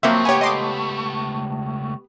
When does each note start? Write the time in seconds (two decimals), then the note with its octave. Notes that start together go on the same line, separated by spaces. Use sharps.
0.03 C#2 F3 F#3 A3 A#3 C4 E5
0.25 B3 G4 C#5 G#5
0.41 D#5 C6 D6